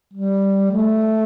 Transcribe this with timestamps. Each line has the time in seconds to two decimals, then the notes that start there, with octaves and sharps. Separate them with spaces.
0.13 G3
0.71 A3